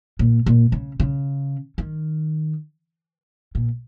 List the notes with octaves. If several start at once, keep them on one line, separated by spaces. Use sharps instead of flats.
A#2
A#2
C#3
C#3
D#3
A#2